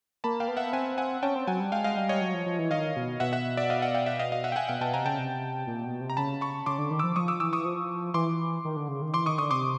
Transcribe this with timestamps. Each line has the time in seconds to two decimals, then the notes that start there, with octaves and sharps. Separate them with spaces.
0.24 A#3 A5 B5
0.40 F5 G5
0.48 B3
0.57 E5 F#5
0.73 C4 F#5 G#5
0.98 F#5 G#5
1.22 C#4 G5 A5
1.35 C4
1.47 F#3 F#5 G#5
1.60 G3
1.72 G#3 F5 G5
1.84 D#5 F5
1.97 G3
2.09 C#5 D#5
2.21 F#3
2.34 F3
2.46 F3
2.59 E3
2.70 D#3 D#5 F5
2.96 B2
3.20 B2 E5 F#5
3.33 E5 F#5
3.57 D5 E5
3.70 D#5 F5
3.82 E5 F#5
3.94 F5 G5
4.06 E5 F#5
4.19 D#5 F5
4.32 D#5 F5
4.44 E5 F#5
4.52 G5
4.56 F#5 G#5
4.69 B2 F5 G5
4.81 B2 G5 A5
4.94 C3 G#5 A#5
5.05 C#3 G5 A5
5.19 C3
5.67 A#2
5.85 B2
6.01 C3
6.10 A#5
6.17 C#3 A5 B5
6.41 B5 C#6
6.66 C#3 C6 D6
6.78 D3
6.91 D#3
6.99 F3 D6 E6
7.16 F3 C#6 D#6
7.28 D6 E6
7.40 E3 D6 E6
7.53 C#6 D#6
7.65 F3
8.14 E3 C6 D6
8.65 D#3
8.76 D3
8.88 C#3
9.02 D#3
9.14 E3 C6 D6
9.25 D#3 C#6 D#6
9.38 D3 C#6 D#6
9.51 C3 C6 D6